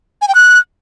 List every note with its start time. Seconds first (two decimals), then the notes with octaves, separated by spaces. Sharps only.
0.21 G#5
0.28 G5
0.35 F#6